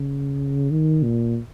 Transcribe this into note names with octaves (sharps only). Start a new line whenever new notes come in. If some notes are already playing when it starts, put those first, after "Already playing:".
Already playing: C#3
D#3
A#2